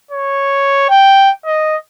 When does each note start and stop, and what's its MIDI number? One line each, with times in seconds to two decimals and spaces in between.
0.11 0.86 73
0.89 1.31 79
1.46 1.76 75